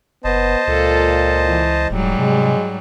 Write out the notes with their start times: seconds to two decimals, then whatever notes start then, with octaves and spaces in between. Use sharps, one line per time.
0.24 F#1 B3 C5 D#5 A5
0.67 C#2 A#2 F4 A4
1.45 E3
1.90 D#1 G#2 F#3 G3
2.19 C3 G#3